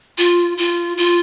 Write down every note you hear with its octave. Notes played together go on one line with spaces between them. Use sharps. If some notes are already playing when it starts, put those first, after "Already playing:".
F4
F4
F4